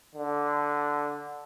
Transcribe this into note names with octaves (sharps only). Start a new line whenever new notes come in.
D3